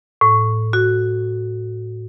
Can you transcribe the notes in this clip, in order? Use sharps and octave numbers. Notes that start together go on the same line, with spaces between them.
A2
F#4